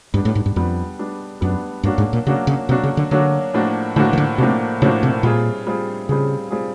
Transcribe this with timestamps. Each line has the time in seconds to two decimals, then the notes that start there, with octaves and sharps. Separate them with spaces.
0.14 G2 G3 B3 D4
0.25 A2
0.35 G#2
0.46 G2
0.56 F2 G3 B3 D4
0.99 G3 B3 D4
1.41 F#2 G3 B3 D4
1.83 G2 F#3 A#3 D4 F#4
1.98 G#2
2.13 A#2
2.27 C#3 F#3 A#3 D4 F#4
2.47 C#3
2.68 C3 F#3 A#3 D4 F#4
2.84 C#3
2.97 D3
3.11 D3 F#3 A#3 D4 F#4
3.54 A2 F3 A#3 D4 F#4
3.96 A2 D3 F3 A#3 D4 F#4
4.13 D#3
4.18 D3
4.38 A2 C3 F3 A#3 D4 F#4
4.82 A2 C#3 F3 A#3 D4 F#4
5.03 C3
5.23 A#2 G3 C4 F4 G#4
5.67 G3 C4 F4 G#4
6.09 C#3 G3 C4 F4 G#4
6.51 G3 C4 F4 G#4